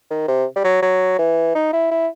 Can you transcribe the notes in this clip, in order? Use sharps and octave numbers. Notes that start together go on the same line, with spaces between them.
D#3
C3
G3
F#3
F#3
E3
D#4
E4
E4